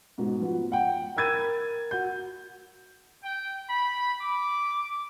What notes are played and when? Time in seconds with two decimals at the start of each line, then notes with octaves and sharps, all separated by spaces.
0.18 G#2 B2
0.41 F3 B3
0.72 F#5 G5
1.16 A#4 B5 E6 G#6 A6 D#7
1.91 F#4 G6
3.22 G5
3.70 B5
4.20 D6